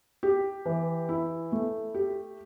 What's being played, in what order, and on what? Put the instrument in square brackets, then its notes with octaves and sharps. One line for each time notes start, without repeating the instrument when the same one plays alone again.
[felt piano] G4
E3
E4
A3
G4